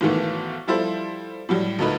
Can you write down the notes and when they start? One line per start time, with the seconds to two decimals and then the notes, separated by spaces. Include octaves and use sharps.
0.01 B1 G#2 D#3 E3 A3
0.67 F3 G3 E4 A4 C5
1.49 A2 F#3 G3
1.79 D2 A#2 A3 D#4 B4